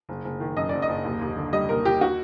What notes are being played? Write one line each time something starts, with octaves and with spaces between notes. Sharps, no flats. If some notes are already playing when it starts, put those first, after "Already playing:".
F#1
F#1
D#3
F#2 D#5
F#1 D5
D#5
F#1
D#2
D#2
D3
G3 D#5
D#2 A#4
D#2 G4
F#4